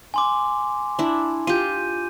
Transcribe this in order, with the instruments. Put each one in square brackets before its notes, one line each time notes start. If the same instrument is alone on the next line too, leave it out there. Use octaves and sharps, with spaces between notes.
[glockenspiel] G#5 C6 D6
[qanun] D4 E4
[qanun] F4 G4 [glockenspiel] G6 D#7